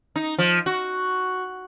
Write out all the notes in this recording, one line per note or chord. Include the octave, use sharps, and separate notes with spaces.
D#4
F3
F#4